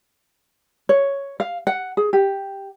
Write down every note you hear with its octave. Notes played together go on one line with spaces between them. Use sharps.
C#5
F5
F#5
G#4
G4